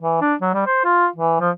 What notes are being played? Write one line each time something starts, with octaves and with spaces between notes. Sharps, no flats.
E3
D4
F#3
G3
C5
F4
E3
F3